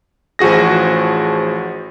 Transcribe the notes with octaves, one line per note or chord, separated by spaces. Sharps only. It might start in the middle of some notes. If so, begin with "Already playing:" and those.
A1 F3 F#4 G#4 A#6